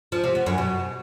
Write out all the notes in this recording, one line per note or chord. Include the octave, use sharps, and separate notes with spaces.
F3
C3
B3
F#2
B2